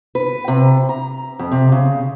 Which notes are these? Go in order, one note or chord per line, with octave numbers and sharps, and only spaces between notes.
B4
C3
A#5
F2
C3
C#3